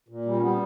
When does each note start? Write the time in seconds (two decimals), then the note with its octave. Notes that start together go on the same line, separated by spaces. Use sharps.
0.08 A#2
0.25 G3
0.35 C#4
0.41 G3 B3